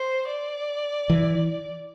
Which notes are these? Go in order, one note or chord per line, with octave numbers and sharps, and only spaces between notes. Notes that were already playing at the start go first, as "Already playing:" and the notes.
Already playing: C5
D5
E3